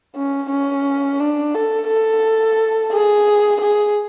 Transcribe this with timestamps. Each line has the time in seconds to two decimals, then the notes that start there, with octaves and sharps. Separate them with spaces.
0.16 C#4
0.50 C#4
1.20 D4
1.55 A4
1.88 A4
2.91 G#4
3.61 G#4